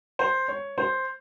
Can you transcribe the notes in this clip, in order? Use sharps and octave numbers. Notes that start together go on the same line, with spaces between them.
C5
C#5
C5